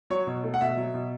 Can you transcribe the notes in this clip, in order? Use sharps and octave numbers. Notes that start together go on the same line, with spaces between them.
F#3 C#5
B2
A3
F#5
B2 E5
F#3
B2